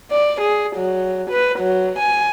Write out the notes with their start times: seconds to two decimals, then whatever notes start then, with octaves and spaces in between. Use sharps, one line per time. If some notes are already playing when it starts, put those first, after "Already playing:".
0.11 D5
0.41 G#4
0.76 F#3
1.31 B4
1.59 F#3
1.99 G#5